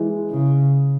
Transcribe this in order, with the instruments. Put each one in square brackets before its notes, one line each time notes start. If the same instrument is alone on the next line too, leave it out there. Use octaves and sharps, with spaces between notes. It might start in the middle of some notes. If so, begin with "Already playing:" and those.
Already playing: [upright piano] E3 G#3
[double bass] C#3